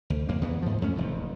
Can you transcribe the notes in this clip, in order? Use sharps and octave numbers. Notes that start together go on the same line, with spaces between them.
D2
F2 A#3
E2 E3 B3
G#2 F3
F2 A3 C#4
F1 E2